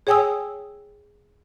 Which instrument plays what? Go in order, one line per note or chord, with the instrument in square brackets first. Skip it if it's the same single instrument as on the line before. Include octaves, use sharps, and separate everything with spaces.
[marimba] G#4 C#5 G5 G#5 D#6 E6